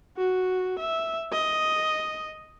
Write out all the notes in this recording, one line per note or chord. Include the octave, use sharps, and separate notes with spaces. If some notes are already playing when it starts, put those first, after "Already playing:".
F#4
E5
D#5